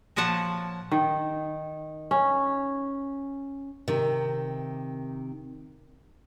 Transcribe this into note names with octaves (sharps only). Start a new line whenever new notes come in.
A#2 F3 C#5 F#5 A5
D#3
C#4
C3 D#3